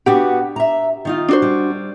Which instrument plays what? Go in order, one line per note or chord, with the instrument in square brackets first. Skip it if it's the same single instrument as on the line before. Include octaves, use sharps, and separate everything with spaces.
[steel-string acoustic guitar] B3 F#4 F#5 [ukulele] D4 G4
[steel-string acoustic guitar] E5 A#5
D#3 D#4 F4
[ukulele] D4 F#4 C5
[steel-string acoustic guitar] G3